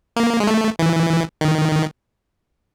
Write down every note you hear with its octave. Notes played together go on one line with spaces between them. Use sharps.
A#3
G#3
A3
E3
D#3